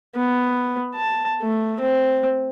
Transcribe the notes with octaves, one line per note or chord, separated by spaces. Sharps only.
B3
A5
A3
C4